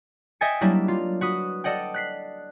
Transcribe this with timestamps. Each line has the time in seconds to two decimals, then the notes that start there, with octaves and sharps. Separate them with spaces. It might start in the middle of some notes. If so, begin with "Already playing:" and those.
0.41 D#5 E5 G5 G#5 A6 C#7
0.61 F#3 G3 A#3 D4 E4
0.88 F4
1.21 F#4 B4 D#6
1.64 A4 D5 D#5 F#5 G5
1.94 F#6 B6 C7